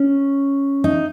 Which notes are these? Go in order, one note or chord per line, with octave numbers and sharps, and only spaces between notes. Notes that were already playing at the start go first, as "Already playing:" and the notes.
Already playing: C#4
D#4